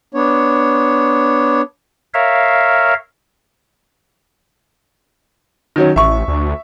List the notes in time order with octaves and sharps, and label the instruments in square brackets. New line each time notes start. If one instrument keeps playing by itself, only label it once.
[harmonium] B3 D4 C#5
[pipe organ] A#4 C#5 E5 F5
[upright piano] D#3 F#3 C#4
[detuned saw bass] A1 [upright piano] E5 C#6
[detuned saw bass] D2